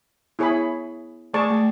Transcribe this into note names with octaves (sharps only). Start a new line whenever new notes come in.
B3 E4 G#4 C#5 G#5 B5
A3 G#4 D5 A5 C#6
A3